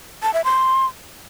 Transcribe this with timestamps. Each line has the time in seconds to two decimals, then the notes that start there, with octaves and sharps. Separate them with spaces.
0.23 A5
0.34 E5
0.45 C6